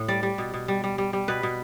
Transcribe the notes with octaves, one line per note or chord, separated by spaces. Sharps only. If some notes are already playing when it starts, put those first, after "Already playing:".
Already playing: A2
G3 D5
G3
B2
B2
G3
G3
G3
G3
B2 B4
B2